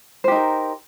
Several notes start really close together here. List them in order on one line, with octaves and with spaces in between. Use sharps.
C5 G4 D#4 A#4